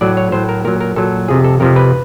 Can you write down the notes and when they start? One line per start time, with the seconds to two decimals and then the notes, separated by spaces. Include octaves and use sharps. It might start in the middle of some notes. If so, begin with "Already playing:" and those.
0.01 A2 F#3 D5
0.17 C#5
0.32 A2 F#3 C5
0.49 A#4
0.65 A#2 F#3 A#4
0.80 A#4
0.96 A#2 F#3 A4
1.28 F2 C3 F3 G#4
1.44 A4
1.60 F2 C3 F3 A#4
1.76 B4